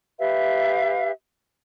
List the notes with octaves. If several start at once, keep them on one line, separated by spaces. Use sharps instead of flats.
G4 B4 E5 F5